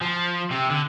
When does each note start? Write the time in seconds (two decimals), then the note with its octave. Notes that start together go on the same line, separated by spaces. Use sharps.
0.01 F3
0.51 C3
0.70 D3